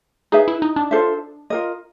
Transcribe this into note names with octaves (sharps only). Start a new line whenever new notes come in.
D#4 G#4 B4 E5
E4
D#4
D4
F4 A4 C5 E5
F4 A#4 D#5